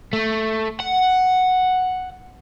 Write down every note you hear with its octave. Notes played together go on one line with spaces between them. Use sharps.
A3
F#5